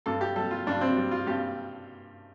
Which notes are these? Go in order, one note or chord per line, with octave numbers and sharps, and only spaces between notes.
G2 A4
G4
G3 A4
F4
G2 D4
C4
G3
F4
G2 G4